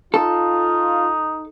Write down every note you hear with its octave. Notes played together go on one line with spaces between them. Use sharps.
D#4 F4 A4